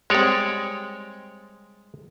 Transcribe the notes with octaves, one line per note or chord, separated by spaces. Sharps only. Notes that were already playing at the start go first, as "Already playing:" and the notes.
G3 G#3 C4 C#5 D5